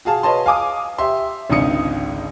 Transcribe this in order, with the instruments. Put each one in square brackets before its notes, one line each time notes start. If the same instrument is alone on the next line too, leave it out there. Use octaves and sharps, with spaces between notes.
[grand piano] F#4 G#4 F5 A5
B4 C#5 D#5 A5 C6
F5 G#5 D6 D#6
G4 E5 C6
G#1 C#2 D3 D#4 D#6 C#7